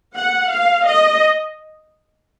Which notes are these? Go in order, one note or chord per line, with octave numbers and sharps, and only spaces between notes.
F#5
F5
D#5